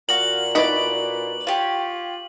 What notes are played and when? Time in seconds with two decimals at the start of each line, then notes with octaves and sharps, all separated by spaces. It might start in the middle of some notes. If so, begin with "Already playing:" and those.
0.09 A#2 F#4 F5 F#7
0.55 D#4 E4 F#4 B4 D5
1.47 F4 G4 C#5